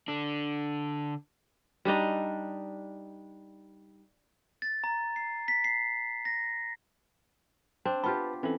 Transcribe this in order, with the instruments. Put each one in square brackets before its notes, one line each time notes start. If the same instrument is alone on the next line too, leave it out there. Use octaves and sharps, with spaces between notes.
[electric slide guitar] D3 D4
[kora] G3 D4 D#4 D#5
[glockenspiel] A6
A#5
C7
B6
C7
A#6
[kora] C4 D4
[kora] B3 F4 G4 [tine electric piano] B4 A5 B5
[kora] E3 [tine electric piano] C4 C#4 A4